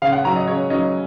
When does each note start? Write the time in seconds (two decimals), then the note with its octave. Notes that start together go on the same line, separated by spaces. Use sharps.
0.02 C#3 F5
0.13 F#5
0.24 F#3 C#4 A#5
0.36 D#5
0.48 C#3 C#5
0.70 F#3 C#4 D#5